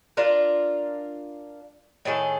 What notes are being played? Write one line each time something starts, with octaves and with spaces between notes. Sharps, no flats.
D4 F4 A#4
A2 D#3 G#4 A4